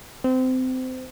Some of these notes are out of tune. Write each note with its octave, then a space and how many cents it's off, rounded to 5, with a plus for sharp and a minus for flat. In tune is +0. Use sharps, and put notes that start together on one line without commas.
C4 -25